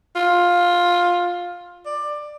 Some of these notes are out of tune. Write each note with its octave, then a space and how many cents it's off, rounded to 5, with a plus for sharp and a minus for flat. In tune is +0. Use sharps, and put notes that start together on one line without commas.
F4 +10
D5 +15